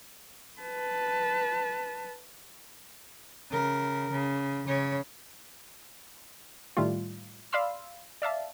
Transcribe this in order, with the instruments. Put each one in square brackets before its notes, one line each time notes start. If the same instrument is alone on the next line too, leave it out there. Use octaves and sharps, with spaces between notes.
[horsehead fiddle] B4 A5
[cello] C#3 A#4
C#3
C#3 C#5
[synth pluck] A2 D#3 G3 A3 F4
D5 F5 B5 C6 E6
D5 E5 F5 A5